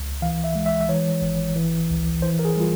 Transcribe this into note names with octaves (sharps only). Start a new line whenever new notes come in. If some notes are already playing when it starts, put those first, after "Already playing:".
Already playing: C#2
E3 F5
E5
G#3
E5
E5
E3 C#5
G#1
E3
C#2
E3 C5
A#4
G#4
G3 F4